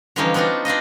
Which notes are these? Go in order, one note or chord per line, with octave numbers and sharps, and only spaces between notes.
D3 E3 F3 G3 C#4 D#4
B3 C4 D4 D#4 F4 F#4
C4 D4 F4 D#5